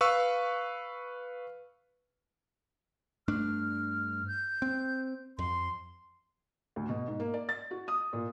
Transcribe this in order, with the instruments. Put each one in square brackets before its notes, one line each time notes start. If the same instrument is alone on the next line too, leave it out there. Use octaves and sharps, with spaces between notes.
[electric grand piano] B4 F5 C#6 E6
[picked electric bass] G2 A3 D4 [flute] F6
[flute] G6
[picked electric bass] C4
[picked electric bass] F2 [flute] C6
[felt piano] D2
B2
G#2
A#3
D5
A6
F#4
D#6
A#2